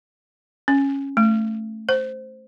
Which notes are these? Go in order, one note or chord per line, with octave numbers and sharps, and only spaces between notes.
C#4
A3
C5